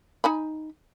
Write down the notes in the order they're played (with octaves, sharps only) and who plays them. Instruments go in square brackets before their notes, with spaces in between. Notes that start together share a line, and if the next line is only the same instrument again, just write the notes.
[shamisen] D#4 G#5 B5